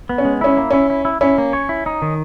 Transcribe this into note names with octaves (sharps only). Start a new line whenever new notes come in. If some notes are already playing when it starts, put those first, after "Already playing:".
B3
C#4
G#3
C#4 E4
A#3
C#4 E4
E4
E4
C#4 E4
A#3
C#5
E4
D#4
D#3